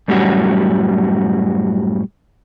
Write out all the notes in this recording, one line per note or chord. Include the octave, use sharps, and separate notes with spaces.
F#2 A2 G3 C#4 F#4